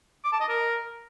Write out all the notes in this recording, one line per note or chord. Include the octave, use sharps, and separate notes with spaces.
D6
A5
D#5
A#4